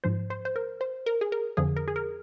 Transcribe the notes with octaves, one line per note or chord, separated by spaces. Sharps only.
G#2 F3 C5
C5
C5
A#4
C5
A#4
G#4
A#4
F2 D3 F3 G#4
A#4
G#4
A#4